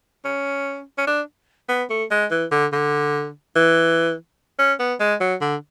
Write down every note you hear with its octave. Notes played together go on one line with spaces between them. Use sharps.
C#4
C#4
D4
B3
A3
G#3
E3
D3
D3
E3
C#4
B3
G#3
F#3
D3